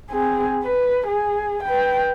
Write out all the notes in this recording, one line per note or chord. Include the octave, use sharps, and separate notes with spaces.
C4 G#4
B4
G#4
B4 G5